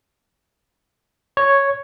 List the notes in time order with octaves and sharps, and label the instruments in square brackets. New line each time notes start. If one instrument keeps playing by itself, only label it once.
[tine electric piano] C#5